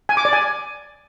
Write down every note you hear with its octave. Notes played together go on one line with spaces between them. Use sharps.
G#5
D6
D5
G#5